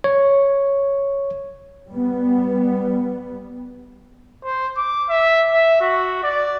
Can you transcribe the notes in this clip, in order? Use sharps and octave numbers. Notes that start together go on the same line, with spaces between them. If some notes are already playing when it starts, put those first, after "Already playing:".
C#5
G3 B3
C5
D6
E5
E5
F#4
D5